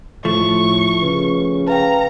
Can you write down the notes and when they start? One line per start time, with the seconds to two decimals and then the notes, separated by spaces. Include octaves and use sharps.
0.25 A2 F3 A3 C#6
1.02 C#3 B4
1.68 B4 F5 G5 A#5